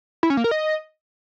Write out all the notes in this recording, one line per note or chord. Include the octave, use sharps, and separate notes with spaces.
E4
C#4
A#3
A#4
D#5